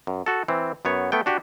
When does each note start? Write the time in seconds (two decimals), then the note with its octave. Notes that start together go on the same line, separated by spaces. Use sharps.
0.07 F#2
0.26 F#4 A4
0.48 E3 C4
0.85 F#2 B3 C#5
1.12 A3 B3 G5
1.26 D4 F#4 G4